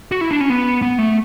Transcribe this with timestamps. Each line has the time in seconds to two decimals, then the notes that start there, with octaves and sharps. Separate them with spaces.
0.12 F#4
0.21 E4
0.31 D4
0.41 C#4
0.50 B3
0.82 B3
0.98 A3